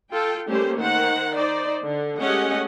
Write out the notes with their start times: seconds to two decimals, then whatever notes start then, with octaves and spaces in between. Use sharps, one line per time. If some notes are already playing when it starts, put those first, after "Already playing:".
0.12 F4 A4 G5
0.49 G3 A3 A#3 C#4 G4 C5
0.78 D#3 C5 F#5
1.36 D#4 C5 D5
1.84 D3
2.21 G#3 A3 C#4 G4 D#5 F#5